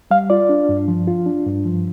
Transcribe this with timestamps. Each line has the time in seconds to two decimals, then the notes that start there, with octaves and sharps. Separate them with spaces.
0.11 G3 F5
0.30 F4 D5
0.49 D4
0.69 G2
0.88 F3
1.07 F4
1.26 D4
1.46 G2
1.65 F3